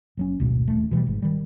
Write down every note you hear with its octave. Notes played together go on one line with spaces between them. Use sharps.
F#1 F#3 C#4
D1 G#1 B2
D#1 A3
B2 E3 F#3 G3
G#1 G#2
D#3 G3